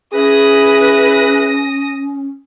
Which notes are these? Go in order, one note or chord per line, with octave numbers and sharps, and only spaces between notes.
C#4 E4 G#4 B4 D#6 A#6